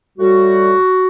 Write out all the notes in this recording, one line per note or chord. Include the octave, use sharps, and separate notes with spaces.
A2 G3 F#4